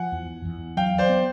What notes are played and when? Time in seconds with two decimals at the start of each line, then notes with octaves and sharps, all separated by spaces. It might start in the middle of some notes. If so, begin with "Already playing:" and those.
Already playing: F3 F#5 G#5
0.12 E2
0.45 E2
0.77 F#3 F5 G5
0.98 C5 D5
1.09 B3